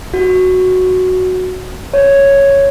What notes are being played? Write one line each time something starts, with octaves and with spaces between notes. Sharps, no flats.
F#4
C#5